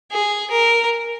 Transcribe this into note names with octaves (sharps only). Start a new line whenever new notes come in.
G#4
A#4